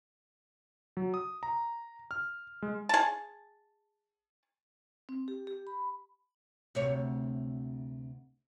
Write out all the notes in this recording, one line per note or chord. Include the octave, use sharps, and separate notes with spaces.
F#3
D#6
A#5
F6
G#3
G#4 A5
C4
G4
G4
B5
D2 C3 C#5